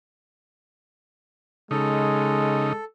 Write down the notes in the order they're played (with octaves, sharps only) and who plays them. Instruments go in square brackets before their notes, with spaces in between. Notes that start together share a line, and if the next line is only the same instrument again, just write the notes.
[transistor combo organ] C#3 D#4 [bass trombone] G#3 [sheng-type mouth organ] A4